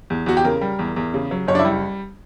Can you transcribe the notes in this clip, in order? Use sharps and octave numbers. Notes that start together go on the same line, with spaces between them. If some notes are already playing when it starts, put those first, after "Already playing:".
E2
E2 F#4
G4
C#3 A#4
G3
E2
E2
C#3
F#3
F#1 C#5
D4
E4
G3